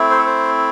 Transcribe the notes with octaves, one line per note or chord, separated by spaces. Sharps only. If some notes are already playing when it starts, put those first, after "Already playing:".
Already playing: A3 C4 E4
C5
A4
C5